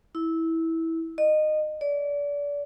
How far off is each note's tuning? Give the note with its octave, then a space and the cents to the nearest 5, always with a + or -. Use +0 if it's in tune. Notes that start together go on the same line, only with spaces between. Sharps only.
E4 -15
D#5 -20
D5 -30